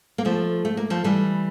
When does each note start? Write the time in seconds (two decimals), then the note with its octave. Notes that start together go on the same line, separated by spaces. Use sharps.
0.18 A#3
0.25 F3 A3
0.65 A3
0.77 A#3
0.90 F3 A3
1.04 E3 G3